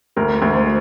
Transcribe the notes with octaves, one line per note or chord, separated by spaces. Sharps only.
D2 A#4
D2
C5